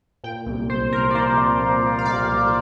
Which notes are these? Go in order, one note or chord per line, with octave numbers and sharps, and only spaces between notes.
A#2 G5
C2
C2 C5
C2 A#4
D5
F3 C5
F3
A#2
F3
F5
C2 D5
C2